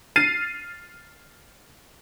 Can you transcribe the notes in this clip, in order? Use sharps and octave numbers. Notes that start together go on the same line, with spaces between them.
F6 A6 C7 D#7